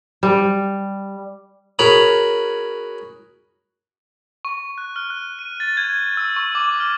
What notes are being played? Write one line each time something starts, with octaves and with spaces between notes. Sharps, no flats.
G3
C#4 F#4 G#4 A#4 A#5 B5
C#6
F#6
F6
F#6
D#7
A6
G#6
E6
C#6
D6
F6